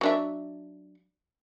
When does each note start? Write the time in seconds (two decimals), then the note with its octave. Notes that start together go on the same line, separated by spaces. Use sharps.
0.01 F#3 D4 E5